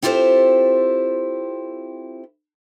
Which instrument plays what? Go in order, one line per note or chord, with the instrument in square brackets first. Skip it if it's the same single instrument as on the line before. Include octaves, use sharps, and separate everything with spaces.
[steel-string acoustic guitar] C4 E4 F4 G4 A4 C5